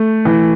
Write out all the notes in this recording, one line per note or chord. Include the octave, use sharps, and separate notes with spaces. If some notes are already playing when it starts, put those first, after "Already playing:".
Already playing: A3
E3